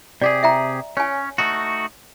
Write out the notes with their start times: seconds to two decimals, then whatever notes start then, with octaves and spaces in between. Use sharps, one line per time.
0.22 C3 G4 G#4 D5
0.43 E5 G5 A#5
0.97 C#4 C#5 G#5
1.38 A3 D#4 F#4